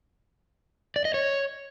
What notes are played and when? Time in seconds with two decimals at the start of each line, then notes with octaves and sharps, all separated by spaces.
0.96 D5
1.05 D#5
1.14 C#5